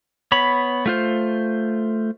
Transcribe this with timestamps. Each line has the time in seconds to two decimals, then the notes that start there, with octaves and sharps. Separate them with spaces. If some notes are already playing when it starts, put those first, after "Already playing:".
0.32 B3 C#5 B5
0.86 A3 F4 C5